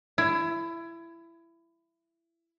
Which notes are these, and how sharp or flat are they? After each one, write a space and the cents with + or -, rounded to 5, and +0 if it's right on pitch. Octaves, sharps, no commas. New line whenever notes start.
E4 +20